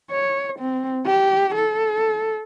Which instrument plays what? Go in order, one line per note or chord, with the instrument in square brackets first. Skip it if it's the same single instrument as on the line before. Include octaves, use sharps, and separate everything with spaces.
[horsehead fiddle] C#5
C4
G4
A4